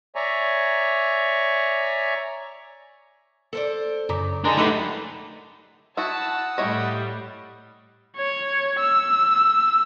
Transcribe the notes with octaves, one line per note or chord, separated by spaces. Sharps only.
C#5 D5 E5 G#5 A#5 C#6
A4 C5 D5
F#2 C#3 A#5 D6
G#3 D4 D#4 A4 A#4 A#5
F#3 A3 D#4 E4 G4 A4 B4 D#5
E4 F#4 F#5 A5 D#6 E6
A2 G3 E4 C#5 D#5
C#5
E6